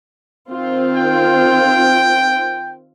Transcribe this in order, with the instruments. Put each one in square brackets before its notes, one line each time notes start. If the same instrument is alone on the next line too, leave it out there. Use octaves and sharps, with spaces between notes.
[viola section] D#3 C4 F4
[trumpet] G5